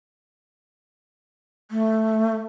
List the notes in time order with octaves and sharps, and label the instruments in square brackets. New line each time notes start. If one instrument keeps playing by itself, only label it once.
[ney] A3